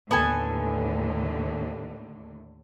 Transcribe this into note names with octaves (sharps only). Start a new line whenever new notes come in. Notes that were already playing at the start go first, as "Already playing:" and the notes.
D#2 A2 D3 B3 A4 G#5